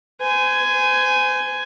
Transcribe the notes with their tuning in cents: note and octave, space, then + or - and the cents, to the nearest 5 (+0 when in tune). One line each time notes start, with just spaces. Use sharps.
C5 -35 G#5 +5